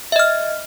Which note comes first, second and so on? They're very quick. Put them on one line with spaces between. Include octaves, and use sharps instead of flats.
E5 D#5 F6